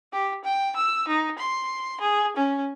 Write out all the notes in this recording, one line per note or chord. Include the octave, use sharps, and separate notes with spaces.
G4
G5
E6
D#4
C6
G#4
C#4